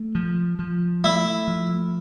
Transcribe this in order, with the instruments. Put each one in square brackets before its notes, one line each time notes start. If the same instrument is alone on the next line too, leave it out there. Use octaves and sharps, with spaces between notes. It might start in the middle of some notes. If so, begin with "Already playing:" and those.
Already playing: [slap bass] A3
F3
F3
[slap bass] A3 [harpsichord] E4
[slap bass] F3